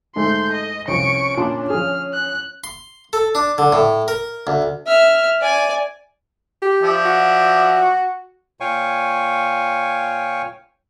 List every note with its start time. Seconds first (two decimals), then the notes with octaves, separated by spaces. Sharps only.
0.16 G#2 G#3 A3 A4 C6 G6
0.52 D#5
0.88 C2 F3 C#4 C#6 D7
1.37 A#2 D4 A5 C6
1.70 F3 G#4 F6
2.13 F#6
2.64 C6
3.13 A4
3.35 D4
3.58 D3
3.72 A2
4.08 A#4
4.47 D2
4.87 E5 F6
5.41 D5 G#5
6.62 G4
6.82 F3 D5 E5
7.05 F#4
8.60 A#2 C#5 F5 G5 G#5 C#6